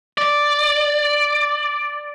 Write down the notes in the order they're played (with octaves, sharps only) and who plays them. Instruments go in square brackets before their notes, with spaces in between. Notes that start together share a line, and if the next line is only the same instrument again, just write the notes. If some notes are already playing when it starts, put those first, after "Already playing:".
[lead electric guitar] D5